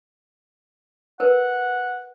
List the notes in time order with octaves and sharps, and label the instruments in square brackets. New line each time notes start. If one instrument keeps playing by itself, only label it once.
[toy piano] A#4 B4 [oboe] F#5